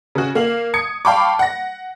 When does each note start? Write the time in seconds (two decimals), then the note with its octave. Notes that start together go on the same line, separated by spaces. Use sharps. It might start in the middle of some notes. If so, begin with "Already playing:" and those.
0.15 C#3 F#4
0.35 A#3 F5 F#7
0.74 D#6 G#6 C#7
1.05 F5 G5 A5 B5 C#6 D6
1.39 F#5 A#6